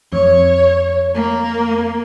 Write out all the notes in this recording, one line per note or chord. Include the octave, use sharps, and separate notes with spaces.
F2 C#5
A#3